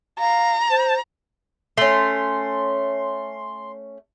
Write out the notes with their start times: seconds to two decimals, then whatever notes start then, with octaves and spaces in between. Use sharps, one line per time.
0.19 F5 A#5
0.70 C5
1.77 A3 C#4 C6